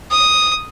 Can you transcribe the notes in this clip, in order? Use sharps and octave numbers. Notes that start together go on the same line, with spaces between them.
D#6